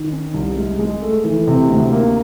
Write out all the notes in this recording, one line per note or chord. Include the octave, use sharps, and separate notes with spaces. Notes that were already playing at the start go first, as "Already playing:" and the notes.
Already playing: D#3
C#4
C2
G#3
G#3
A3
E3
C3
D2
A#3